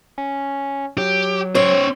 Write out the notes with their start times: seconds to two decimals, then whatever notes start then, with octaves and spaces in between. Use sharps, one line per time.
0.18 C#4
0.98 F#3 G4
1.55 C#4 C5 C#5